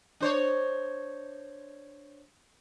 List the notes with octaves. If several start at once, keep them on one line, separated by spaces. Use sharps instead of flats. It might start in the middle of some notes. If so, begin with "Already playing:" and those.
D4 C5 C#5